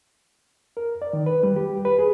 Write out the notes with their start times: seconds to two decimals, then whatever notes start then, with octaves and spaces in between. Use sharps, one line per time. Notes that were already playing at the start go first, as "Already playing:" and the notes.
0.77 A#4
1.02 D5
1.13 D#3
1.26 B4
1.43 G3
1.56 G4
1.85 B4
1.99 G#4